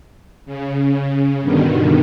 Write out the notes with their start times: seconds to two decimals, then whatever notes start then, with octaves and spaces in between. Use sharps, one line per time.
0.46 C#3
1.41 G2 B2 D3 D#3